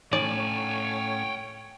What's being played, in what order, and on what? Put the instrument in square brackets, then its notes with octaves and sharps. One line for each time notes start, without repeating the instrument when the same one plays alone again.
[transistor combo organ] A2 C#4 [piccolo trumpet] C#5 [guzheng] D5 [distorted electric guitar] G5 G#5